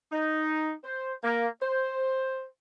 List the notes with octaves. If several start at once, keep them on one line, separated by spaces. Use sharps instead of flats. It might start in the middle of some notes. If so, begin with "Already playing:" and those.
D#4
C5
A#3
C5